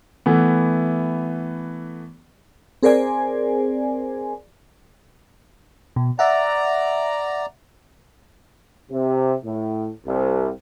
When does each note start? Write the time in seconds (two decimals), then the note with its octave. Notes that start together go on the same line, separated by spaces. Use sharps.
0.26 E3 A3 B3
2.83 C4 G#4 A#4 C5 D5 G#5
5.96 B2
6.19 D5 E5 F#5 A#5
8.91 C3
9.44 A2
10.06 C2